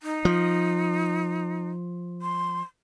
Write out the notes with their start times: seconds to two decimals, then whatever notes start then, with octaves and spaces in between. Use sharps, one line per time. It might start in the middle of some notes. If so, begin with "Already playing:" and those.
0.03 D#4
0.25 F3
2.22 C6